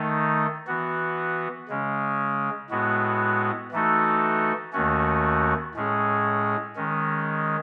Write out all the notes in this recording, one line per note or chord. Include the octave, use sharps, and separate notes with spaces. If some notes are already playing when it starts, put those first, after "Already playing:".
Already playing: D#3 A3 D#4
E3 B3 F#4
C#3 G#3 C#4
A2 G#3 B3 F#4
E3 A3 D#4 F#4 A4
D#2 D#3 A3 C#4 F#4
A2 G#3 C#4 G#4
D#3 G#3 C#4